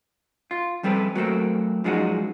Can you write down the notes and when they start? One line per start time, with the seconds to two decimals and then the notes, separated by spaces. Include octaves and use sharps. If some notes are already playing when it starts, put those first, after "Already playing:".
0.51 F4
0.83 F2 G3 C4 A4 B4
1.15 F#3 A3 A#3 C4
1.84 F#2 F3 G#3 D#4 F#4